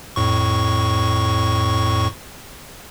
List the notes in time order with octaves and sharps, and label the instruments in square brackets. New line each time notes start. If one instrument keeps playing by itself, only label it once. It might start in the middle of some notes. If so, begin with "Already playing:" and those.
[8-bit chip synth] F2 A2 C#6